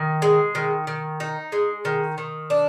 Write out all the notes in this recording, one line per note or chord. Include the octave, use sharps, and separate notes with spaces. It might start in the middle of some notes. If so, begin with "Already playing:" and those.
Already playing: D#3
G#3
D#3
D#3
D#4
G#3
D#3
D#3
D4